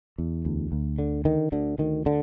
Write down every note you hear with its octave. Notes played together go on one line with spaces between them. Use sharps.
E2
D2
D2
D3
D3 D#3
D2 D3
D2 D#3
D3